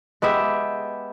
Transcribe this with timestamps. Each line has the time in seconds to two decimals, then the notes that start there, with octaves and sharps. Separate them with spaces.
0.22 G#3 B3 G4 E5